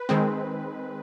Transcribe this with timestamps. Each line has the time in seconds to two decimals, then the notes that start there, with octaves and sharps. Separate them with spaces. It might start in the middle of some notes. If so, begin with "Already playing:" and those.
Already playing: B4
0.09 D#3 G#3 C4